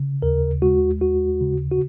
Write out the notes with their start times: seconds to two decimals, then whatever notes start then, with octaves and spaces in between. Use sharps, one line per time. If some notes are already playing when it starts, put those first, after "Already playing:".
Already playing: C#3
0.22 D#2 A#4
0.62 G#3 F#4
1.01 D#2 F#4
1.41 C#3
1.71 F#4